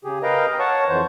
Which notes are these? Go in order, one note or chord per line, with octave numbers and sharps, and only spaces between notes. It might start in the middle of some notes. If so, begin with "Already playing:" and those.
C#3 G4 G#4
A#4 B4 D#5 F5 G5 A#5
C#5 F#5 A5 C#6
F2 E3 C5